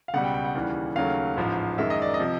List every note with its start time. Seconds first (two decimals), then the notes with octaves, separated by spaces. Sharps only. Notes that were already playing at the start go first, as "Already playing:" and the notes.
0.08 F5
0.14 C#2 B2 G3 F#5
0.24 G5
0.34 G5
0.44 F#5
0.55 D#2 C#3 E3 G3
0.96 D#2 C#3 F#3 A3 F5
1.37 A1 G#2 F3
1.78 F#2 D#3 G#3 E5
1.90 D#5
2.02 D5
2.14 D#5
2.20 C3 F3